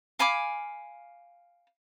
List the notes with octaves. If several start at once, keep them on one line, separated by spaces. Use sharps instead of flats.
F5 G#5 B5 D6